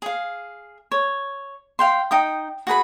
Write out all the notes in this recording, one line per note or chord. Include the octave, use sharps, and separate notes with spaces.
G#4 F5
C#5
F5 G5 C6
D#4 G5 D#6
F#4 G#4 B4 B5